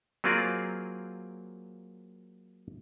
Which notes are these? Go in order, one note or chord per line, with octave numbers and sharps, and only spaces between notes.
F#3 A#3 C4 F4 G#4 D5